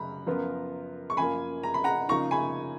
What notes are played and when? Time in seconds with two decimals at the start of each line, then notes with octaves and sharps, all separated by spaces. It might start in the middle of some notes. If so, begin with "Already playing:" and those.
Already playing: F#2 C#3 F#3 A#5 B5
0.27 F#2 F3 B3 F4 A#4
1.10 C#6
1.17 F#2 F3 A#3 G#5 B5
1.63 A#5
1.74 B5
1.84 F#5 A#5
2.09 C#3 F3 A#3 D#4 A#5 C#6
2.31 G#5 B5